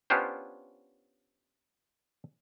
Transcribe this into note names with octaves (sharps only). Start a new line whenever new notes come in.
B3 C#4 D4 F4 G4 C5